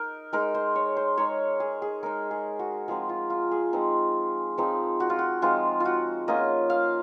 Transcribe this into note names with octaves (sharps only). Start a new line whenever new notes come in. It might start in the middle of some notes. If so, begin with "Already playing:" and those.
Already playing: D#4 A#4
G#3 D#4 A#4
C5
C#5
C5
G#3 D#4 C#5
G#4
G#4
G#3 D#4 A#4
G#4
F#4
F3 G#3 C4 D#4 G#4
F4
F4
G#4
F3 G#3 C4 D#4
F3 G#3 C4 D#4
F#4
F4
F#4
F3 G#3 C4 D#4 F4
F4
F#4
A#3 C#4 F4 D#5
F5